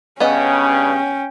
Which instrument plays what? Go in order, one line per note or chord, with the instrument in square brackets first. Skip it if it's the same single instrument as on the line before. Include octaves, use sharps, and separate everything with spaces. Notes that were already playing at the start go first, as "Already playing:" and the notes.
[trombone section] G2 C#3 [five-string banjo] B3 D#5 [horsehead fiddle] C#4 G5